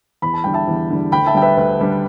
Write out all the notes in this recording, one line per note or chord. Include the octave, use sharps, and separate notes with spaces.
E2 B5
A5
D3 G3 G5
E5 A5
E2
D3 G3
D2 G5 B5
E5 A5
D3 G3 D4 G5
B4 E5
D2 B4
D3 G3 D4